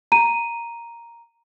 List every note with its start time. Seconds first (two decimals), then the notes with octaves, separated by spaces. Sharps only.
0.12 A#5 D#7